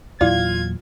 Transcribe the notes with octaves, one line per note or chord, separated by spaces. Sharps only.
E2 A#2 F#3 E4 F4 D5 G#6